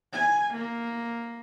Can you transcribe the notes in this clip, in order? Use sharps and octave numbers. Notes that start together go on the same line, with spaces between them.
G#5
A#3